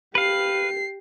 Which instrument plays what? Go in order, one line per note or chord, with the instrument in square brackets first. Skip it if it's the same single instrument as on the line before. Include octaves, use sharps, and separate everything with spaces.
[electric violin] G4 C7 [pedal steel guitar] B4 F5